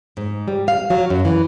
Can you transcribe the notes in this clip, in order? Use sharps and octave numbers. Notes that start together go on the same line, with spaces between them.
G#2
G3
F5
F#3
F#2
E3